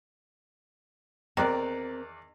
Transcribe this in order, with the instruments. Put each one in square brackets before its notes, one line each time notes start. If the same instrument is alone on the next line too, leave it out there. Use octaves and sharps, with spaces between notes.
[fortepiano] E2 D5 F#6 [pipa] D#3 [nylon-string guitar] C4 A#4